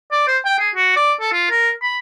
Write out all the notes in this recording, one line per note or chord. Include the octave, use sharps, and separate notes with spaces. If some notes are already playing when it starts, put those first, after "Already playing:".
D5
C5
G5
G#4
F#4
D5
A4
F4
A#4
B5